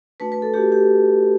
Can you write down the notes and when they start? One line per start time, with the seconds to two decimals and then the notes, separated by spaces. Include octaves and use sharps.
0.20 A3 D4 F#4 B4
0.32 B4
0.42 A4
0.54 A3 D4 F#4 G4
0.72 G4